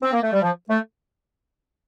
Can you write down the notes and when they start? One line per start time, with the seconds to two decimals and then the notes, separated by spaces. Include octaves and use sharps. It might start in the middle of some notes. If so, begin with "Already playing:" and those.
0.03 C4
0.13 A#3
0.23 A3
0.33 G3
0.42 F3
0.70 A3